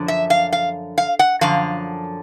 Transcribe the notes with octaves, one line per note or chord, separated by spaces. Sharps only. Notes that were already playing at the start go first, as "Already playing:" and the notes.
Already playing: F#2 D3 F3
E5
F5
F5
F5
F#5
F#2 D3 F3 F5